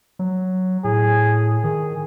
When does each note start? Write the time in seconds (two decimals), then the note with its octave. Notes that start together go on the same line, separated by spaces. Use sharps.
0.19 F#3
0.84 A2 G#4
1.64 D#3 G#4